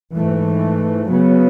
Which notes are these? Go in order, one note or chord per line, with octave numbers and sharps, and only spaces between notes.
G#2 E3 A3
C#3 F#3 B3